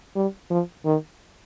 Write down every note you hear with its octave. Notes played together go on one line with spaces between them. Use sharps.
G3
F3
D#3